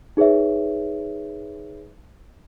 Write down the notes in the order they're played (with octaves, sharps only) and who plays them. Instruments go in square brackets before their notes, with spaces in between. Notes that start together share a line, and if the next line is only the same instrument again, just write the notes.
[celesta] D#4 G#4 B4 C#5 E5